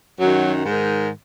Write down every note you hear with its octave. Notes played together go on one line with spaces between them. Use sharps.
F#2 D#3 F#3
G#2 D#3